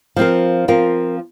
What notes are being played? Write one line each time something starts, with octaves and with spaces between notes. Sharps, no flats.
F3 C4 F4 A#4
F3 C4 F4 A#4